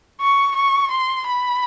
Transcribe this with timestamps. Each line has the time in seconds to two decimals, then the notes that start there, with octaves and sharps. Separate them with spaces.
0.21 C#6
0.56 C#6
0.91 C6
1.27 B5